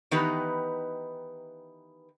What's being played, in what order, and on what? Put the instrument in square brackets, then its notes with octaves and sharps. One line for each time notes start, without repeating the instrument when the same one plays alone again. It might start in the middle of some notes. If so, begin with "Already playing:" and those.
[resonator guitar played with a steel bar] D#3 E3 B3 D#4 G4 B4